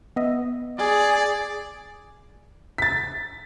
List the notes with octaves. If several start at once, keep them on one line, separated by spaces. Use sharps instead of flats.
B3 D#5 E5
G#4 D5
A6 B6